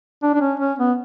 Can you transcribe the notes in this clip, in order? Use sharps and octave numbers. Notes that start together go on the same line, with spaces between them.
D4
D4
C#4
C#4
B3